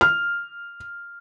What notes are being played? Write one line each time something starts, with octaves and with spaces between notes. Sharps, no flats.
F6